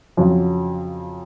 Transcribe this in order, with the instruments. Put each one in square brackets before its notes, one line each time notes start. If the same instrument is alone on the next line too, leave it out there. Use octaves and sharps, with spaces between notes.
[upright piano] F2 C#3 F#3